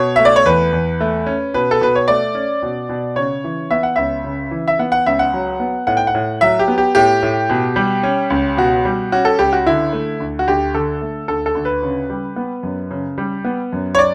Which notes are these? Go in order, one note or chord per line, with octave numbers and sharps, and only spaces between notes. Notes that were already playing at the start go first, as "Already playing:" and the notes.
Already playing: B2 C#5
A3 E5
D5
C#5
E2 B4
E2
A3
C#4
B2 B4
A4
B2 B4
C#5
A3 D5
C#4
B2
B2
C#3 C#5
E3
B3 E5
F#5
C#2 E5
C#3
E3
E5
B3 F#5
F#5
C#2 E5
F#5
F#3
B3
A2 F#5
G5
F#5
A2
F#3 E5
G4
B3
G4
A2 G4
A2
B2
G3
C#4
C#2
B2 F#4
G3
C#4 F#4
A4
C#2 G4
F#4
D3 E4
A3
D2
F#4
D2 G4
D3 A4
A3
D2 A4
A4
D2
B4
C#3
G3
B3
F#2
C#3
G3
B3
F#2
C#5
D5